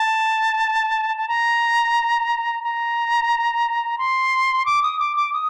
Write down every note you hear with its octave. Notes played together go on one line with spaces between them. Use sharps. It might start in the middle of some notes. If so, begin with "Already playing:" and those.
Already playing: A5
A5
A#5
A#5
C6
D6
D#6
D6
D6
D#6